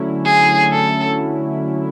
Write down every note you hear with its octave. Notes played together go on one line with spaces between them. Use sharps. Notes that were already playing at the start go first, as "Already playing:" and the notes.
Already playing: D3 F#3 A3 C#4 E4
G#4
A4